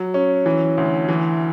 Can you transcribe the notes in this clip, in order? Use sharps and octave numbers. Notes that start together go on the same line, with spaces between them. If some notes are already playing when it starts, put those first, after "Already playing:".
Already playing: F#3
C#4
E3
D2
E3